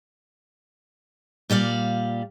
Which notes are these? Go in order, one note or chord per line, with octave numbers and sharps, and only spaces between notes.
A#2 G3 D5 F5